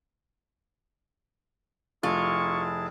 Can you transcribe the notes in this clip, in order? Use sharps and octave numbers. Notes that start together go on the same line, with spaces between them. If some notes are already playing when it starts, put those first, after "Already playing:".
F1 E4 F4 G#4 A5 C#6